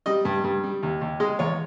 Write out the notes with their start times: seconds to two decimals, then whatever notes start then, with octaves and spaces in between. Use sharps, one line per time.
0.06 G3 D#5
0.25 G2
0.44 G2
0.64 G3
0.83 D#2
1.01 D#2
1.20 G#3 D#5
1.39 E2 C#5